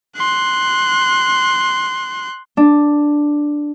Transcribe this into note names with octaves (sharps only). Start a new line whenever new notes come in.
C6 F#6
D4